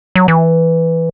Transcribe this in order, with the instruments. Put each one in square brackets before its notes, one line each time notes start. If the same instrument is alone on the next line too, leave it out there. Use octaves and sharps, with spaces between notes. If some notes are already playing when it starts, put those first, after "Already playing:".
[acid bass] F#3
E3